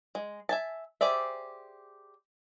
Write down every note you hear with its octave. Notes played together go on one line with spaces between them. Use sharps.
G#3
E5 G#5 A5
G4 G#4 C5 D5 E5